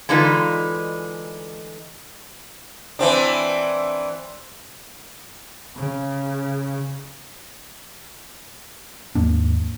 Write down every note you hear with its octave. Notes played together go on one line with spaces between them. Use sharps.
D3 E3 G#3 D#4 F4 B4
E3 C4 D4
C#3
D#2 G#2 A#3 D4